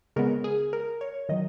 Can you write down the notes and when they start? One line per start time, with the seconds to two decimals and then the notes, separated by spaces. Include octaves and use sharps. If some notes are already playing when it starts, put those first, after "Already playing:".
0.16 C#3 G#3 B3 A#4
0.44 G#4
0.73 A#4
1.01 C#5
1.29 D#3 F#3 D#5